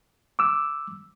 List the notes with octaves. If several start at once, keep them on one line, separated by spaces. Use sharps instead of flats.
D6 E6